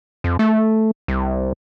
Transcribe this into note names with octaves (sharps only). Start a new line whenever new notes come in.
F2
A3
C2